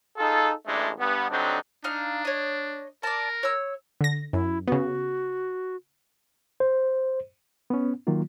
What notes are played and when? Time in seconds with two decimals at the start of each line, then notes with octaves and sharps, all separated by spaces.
0.18 D#4 F4 G#4 A4
0.66 A1 G2 G#3 A3 D4
0.99 G2 B3
1.30 D3 F#3 G3 C4 D4 D#4
1.84 D4 D#4 F5
2.25 C#5 D#5
3.03 A#4 D5 A5
3.43 C#5 E6
4.01 D3 A#6
4.33 F#2 E4
4.68 C#3 B3 F#4
6.60 C5
7.70 B3 C#4
8.07 D#3 F#3 A#3 F4